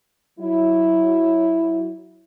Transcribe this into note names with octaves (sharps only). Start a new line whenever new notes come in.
F#3 E4